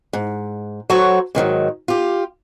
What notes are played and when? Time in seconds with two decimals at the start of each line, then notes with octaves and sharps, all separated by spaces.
0.13 G#2
0.90 F#3 F#4 A4 C5 C#5
1.35 G#2 D#3 F3 F#3
1.88 F4 G4